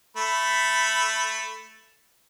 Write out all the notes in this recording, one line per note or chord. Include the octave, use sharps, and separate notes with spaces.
A3 B5